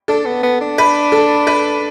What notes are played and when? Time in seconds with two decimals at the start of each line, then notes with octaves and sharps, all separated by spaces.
0.08 D4 A4
0.25 B3
0.43 B3
0.61 D4
0.78 B4
1.12 A4
1.47 B4